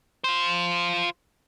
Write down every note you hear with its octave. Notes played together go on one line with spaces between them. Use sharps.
F4 C5